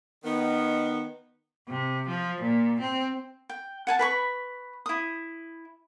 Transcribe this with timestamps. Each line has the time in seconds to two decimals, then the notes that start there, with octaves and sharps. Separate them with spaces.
0.24 D#3 B3 D#5
1.68 C3
2.07 F3
2.41 A#2
2.80 C4
3.49 G5
3.87 F#5 G#5 A5
3.99 B4 B5 C#6
4.86 E4 D#6